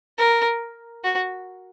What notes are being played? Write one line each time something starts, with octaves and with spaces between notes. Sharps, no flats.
A#4
F#4